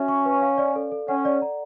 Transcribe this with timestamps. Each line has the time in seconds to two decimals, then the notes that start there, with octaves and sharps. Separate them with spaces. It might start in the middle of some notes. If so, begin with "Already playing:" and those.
Already playing: C#4 F#4 E5 G#5
0.08 C#6
0.26 B4
0.41 F5
0.58 D5
0.76 A4
0.92 A4
1.08 C#4 F#5
1.25 D5
1.42 A#5